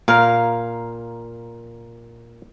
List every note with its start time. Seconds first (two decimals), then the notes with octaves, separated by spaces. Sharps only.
0.08 A#2 A#4 F5